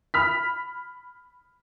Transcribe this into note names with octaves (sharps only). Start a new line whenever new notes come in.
B5 F6 B6